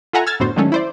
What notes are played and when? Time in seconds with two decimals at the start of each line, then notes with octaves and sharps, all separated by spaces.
0.13 F4 A4 E5 F#5 G#5 A#5
0.27 E6 F6 G#6 A6
0.40 F#2 A2 D3 B3 F#4 C5
0.56 D3 D#3 F#3 G#3 A3 C#4
0.72 E4 C5 D5